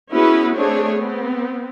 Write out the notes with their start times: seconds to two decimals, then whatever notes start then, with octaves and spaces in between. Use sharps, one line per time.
0.12 B3 C#4 E4 F#4 G#4 B4
0.56 A3 C4 D4 G#4 C#5
0.96 B3 C4